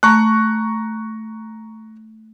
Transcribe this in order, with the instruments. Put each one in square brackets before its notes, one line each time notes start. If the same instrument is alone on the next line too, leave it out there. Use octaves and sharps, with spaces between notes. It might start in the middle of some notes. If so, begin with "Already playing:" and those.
[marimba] A3 [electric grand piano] A#5 C#6 F#6